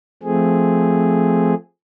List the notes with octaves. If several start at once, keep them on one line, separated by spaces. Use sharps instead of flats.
F3 A3 C4 G#4